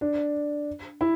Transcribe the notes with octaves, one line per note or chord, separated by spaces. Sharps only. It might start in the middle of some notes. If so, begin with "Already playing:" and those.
D4
E4